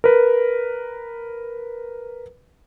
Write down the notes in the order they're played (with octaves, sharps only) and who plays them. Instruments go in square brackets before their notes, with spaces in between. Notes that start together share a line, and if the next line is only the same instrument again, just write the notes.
[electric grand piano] A#4 B4